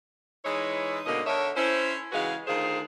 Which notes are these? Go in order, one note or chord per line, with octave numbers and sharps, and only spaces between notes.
E3 G#3 D#4 E4 C#5 D#5
G#2 B2 D3 A#3 D#5
D3 A4 A#4 C#5 E5
C#4 E4 C5
C#3 E3 G#3 F#4 B4 F5
D2 D#3 F4 G#4 C5 F5